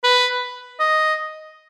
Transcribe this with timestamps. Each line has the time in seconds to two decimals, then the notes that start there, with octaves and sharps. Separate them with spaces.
0.04 B4
0.80 D#5